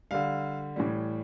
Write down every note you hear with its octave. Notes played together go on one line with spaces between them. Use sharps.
D3 G3 F5
A2 E3 G3